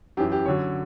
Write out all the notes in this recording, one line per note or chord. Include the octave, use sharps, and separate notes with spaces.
F#2 E3 G4
G4
F#2 D3 F#3 C#5